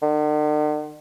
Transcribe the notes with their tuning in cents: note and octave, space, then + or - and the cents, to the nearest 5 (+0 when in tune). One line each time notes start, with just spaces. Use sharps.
D3 +45